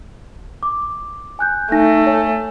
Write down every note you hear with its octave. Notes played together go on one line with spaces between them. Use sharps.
D6
G#5 F#6 G6
A3 D#4 G#5 A#6
C#5 G#5